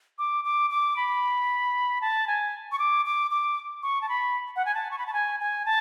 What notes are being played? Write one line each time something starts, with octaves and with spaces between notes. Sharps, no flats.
D6
D6
D6
B5
A5
G#5
C#6
D6
D6
D6
C#6
A5
B5
F#5
G#5
A5
C#6
B5
A5
G#5
G#5
A5